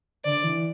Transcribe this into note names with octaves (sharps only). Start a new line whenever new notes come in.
D3 D5
E3